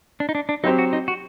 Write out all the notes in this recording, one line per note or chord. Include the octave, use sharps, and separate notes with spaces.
D4
D#4
D4
D4
F#3 C4 D#4 G4 C5
F#4
D#4
F#4